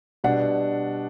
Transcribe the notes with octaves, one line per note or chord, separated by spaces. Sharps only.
B2 G3 D4 F#5